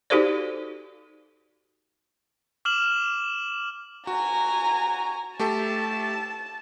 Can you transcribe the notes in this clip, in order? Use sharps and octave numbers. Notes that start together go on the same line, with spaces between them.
D#4 F#4 G4 A4 C5 D5
D6 F6 E7 F#7
F#4 G#5 A#5
A3 G4 A4 A5